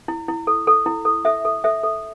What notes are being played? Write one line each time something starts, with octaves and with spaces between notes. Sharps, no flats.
E4
E4
A4
A4
E4
A4
A4 E5
A4
A4 E5
A4